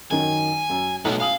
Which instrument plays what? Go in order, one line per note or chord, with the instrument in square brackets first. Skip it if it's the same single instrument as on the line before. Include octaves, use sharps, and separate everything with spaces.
[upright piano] F#2 D#3 [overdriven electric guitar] G#5
[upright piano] F#2
[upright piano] B1 [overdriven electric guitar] A3 B3
[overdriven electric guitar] F5 [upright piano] G#5 D#6 F#7